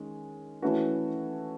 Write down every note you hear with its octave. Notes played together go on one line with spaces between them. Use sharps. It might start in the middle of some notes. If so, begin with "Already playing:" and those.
Already playing: D#3 G#3 C#4
E3 A3 C#4 F#4 B4